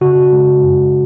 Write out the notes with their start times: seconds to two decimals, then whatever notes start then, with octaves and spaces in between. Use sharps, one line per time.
0.01 C#3 F#4
0.33 G#3
0.63 F#2